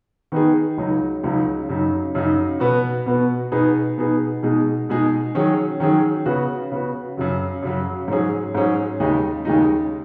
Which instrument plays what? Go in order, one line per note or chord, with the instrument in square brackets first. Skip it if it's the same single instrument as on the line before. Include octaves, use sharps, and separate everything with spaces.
[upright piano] D#3 B3 D#4 G#4
C#2 C#3 F#3 D#4
C#2 C#3 F#3 D#4
F#2 C#3 F#3 D#4
F#2 C#3 F#3 D#4
B2 B3 F#4
B2 B3 F#4
B2 B3 D#4 G#4
B2 B3 D#4 G#4
B2 G#3 D#4 G#4
B2 G#3 D#4 G#4
D#3 F#3 C#4 G#4
D#3 F#3 C#4 G#4
C#3 B3 F#4
C#3 B3 F#4
F#2 C#3 F#3
F#2 C#3 F#3
G#2 F#3 C#4 G#4
G#2 F#3 C#4 G#4
D#2 C#3 G#3 D#4
D#2 C#3 G#3 D#4